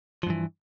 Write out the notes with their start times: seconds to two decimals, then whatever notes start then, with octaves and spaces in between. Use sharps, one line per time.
0.23 F3
0.27 G2
0.30 E3